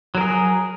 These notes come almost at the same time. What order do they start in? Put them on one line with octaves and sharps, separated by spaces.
F#3 A#4 G#4